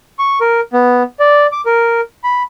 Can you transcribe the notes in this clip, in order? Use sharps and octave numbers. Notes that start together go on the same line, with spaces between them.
C#6
A#4
B3
D5
D6
A#4
B5